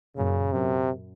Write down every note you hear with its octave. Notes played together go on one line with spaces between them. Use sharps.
F#2 A#2 C#3
F#2 C3